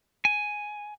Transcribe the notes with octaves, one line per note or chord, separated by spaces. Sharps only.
G#5